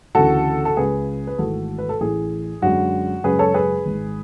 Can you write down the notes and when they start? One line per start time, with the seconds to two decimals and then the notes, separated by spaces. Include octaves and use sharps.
0.15 D2 C#3 E3 F#4 A4
0.65 A4
0.76 C#2 C#3 G#3 G#4 B4
1.27 B4
1.38 G#1 G#2 E3 A3 F#4 A4
1.78 B4
1.89 A4
2.01 A1 A2 E3 G#4
2.62 F#2 D3 G#3 F#4
3.24 F#2 C#3 G#3 G#4 B4
3.39 A4 C#5
3.54 G#4 B4
3.86 G#1 G#2 G#3